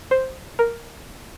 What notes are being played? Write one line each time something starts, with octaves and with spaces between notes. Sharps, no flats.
C5
A#4